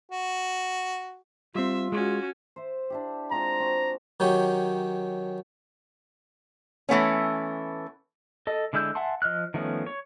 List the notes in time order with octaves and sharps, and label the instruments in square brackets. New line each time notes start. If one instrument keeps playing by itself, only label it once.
[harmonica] F#4
[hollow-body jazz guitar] G3 C4 [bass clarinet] F4 [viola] E5
[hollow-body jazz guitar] G#3 [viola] C#4 F#4
[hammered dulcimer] C5 E5
D4 E4 G4
[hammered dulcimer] G#3 C4 F4 [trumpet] A#5
[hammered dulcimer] C4 F#4
[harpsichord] D#3 F#3 C#4 G4
[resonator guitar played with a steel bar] E3 A3 B3 C#4
[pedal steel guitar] A4 D#5
D3 G#3 E4 E6 G6
E5 F#5 G#5 A5 C6
F3 D#5 F6 F#6
D#3 F3 A3 B3 C#4
C#5